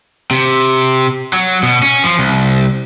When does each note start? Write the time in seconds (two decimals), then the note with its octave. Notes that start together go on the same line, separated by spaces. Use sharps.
0.31 C3
1.33 F#3
1.63 B2
1.82 C#4
2.03 F3
2.19 C2